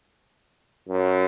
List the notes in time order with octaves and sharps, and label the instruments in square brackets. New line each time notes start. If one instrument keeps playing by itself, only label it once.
[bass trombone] F#2